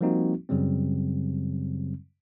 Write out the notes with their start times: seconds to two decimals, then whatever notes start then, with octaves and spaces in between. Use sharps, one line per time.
0.01 F3 G3 A#3 C4 D#4 F#4
0.49 F#2 C#3 F#3 G3 C4